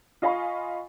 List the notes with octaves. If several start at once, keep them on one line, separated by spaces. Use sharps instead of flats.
F4 D#5 F5 G#5 B5 C#6